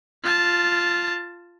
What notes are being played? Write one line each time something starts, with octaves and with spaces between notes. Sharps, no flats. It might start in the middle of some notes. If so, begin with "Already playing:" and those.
F4 A5